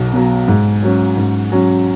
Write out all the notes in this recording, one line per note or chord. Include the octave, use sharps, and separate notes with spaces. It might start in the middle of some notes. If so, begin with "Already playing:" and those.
Already playing: B1 B2 F#3
B2 F#3
G#2
F#3 C#4
G#2
F#3 C#4